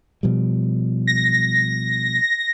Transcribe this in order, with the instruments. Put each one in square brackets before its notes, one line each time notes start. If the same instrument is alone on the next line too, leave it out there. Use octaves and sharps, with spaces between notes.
[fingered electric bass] B2 F3 G3
[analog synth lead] A#6